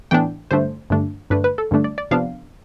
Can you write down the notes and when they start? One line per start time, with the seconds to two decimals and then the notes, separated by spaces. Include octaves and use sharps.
0.11 A2 E3 B3 D4 G5
0.51 G2 D3 A3 D4 C5
0.90 G2 D3 A3 D4
1.30 G2 D3 A3 D4 B4
1.44 B4
1.58 A4
1.71 G2 D3 A3 D4
1.84 D5
1.98 D5
2.11 C3 F3 B3 D4 F5